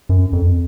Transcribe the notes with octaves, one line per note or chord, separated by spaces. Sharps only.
F#2
F2